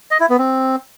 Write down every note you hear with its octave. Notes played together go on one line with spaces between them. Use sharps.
D#5
E4
B3
C4